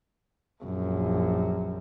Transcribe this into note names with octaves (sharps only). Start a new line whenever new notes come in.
A#1 F#2